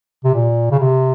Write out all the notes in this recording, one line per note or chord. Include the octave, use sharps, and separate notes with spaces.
C3
A#2
C#3
C3